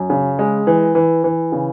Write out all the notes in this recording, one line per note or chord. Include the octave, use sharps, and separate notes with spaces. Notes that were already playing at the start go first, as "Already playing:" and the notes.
Already playing: F#2
C#3
G#3
E3
E3
E3
C#3